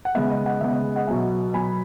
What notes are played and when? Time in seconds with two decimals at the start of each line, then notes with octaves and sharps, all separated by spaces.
0.05 F#5
0.15 C#3 G#3 B3 E5
0.30 D#5
0.46 D#5 F#5
0.61 C#3 G#3 B3 E5
0.73 D#5
0.96 D#5 F#5
1.07 B2 F#3 B3 E5 G#5
1.54 B2 F#3 B3 G#5 B5